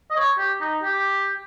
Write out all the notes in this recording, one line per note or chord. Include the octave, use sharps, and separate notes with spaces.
D#5
C#5
G4
D#4
G4